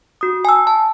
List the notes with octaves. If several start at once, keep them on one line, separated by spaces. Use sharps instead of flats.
F#4 D#6
G#5 A5 E6
A5